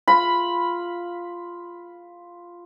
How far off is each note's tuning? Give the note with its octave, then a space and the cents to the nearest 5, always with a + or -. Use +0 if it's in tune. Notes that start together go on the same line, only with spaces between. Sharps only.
F4 +0 B5 +0